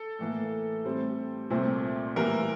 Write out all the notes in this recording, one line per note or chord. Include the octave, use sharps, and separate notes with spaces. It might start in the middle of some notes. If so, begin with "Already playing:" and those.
Already playing: A4
A2 E3 A#3
A2 G3 C4
C2 A#2 A3 C4
A2 E3 G3 A#3 A#4